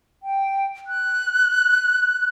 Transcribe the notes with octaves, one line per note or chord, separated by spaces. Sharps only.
G5
F#6